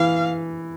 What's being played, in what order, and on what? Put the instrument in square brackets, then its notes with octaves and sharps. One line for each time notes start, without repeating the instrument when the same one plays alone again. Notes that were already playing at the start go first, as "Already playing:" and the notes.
Already playing: [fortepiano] E3 [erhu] F5